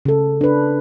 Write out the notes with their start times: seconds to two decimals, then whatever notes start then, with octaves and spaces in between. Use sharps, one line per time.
0.05 C#3 A4
0.41 D4 B4